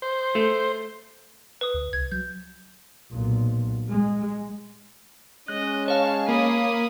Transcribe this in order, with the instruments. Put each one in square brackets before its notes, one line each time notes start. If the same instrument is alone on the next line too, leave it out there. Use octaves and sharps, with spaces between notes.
[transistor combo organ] C5
[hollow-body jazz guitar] A3
[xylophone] B4 D#6
[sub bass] D2
[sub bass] C2 [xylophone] G#6
[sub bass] F#3 [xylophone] G6
[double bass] B1 A#2
G#3
[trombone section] G#3 C#4 [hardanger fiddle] D#5 [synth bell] F#6
[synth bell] C#5 F5 [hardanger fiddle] A5
[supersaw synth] A#3 [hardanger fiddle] B5 D#6